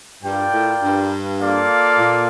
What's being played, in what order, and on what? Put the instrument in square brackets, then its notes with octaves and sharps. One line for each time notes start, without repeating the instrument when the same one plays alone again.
[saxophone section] G2 [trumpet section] F4 A#4 D5 G5
[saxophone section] A2
G2
[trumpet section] A#3 F4 A4 D5 F5
[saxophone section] A#2